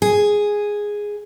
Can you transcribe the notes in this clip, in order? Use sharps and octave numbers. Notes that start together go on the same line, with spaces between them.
G#4